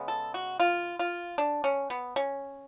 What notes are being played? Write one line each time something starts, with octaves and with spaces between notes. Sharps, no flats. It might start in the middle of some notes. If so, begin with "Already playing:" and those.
Already playing: C#3 G#3 B3
A4
F#4
F4
F4
D4
C#4
B3
C#4